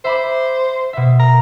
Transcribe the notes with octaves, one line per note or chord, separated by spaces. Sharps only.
C5 E5 B5 D6
B2 E5
A#5